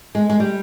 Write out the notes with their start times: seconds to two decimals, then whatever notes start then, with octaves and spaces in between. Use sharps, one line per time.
0.15 G#3
0.30 G#3
0.40 G3